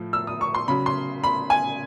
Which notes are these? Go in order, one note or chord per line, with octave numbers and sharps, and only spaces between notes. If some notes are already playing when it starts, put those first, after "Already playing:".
Already playing: A2 F3
E6
D#6
C#6
C6
C#3 F#3 B5
C6
B5
G#5